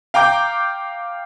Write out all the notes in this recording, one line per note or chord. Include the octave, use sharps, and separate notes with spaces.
F5 G5 A#5 D6 G6